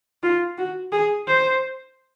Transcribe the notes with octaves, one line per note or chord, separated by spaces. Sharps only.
F4
F#4
G#4
C5